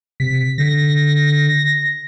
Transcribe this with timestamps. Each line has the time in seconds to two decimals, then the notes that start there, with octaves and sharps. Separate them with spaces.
0.20 C3 B6
0.58 D3 A#6